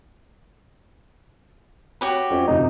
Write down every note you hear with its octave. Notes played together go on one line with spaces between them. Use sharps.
F#4 G4 C#5 B5
F2 C#4
F2 C3 D#4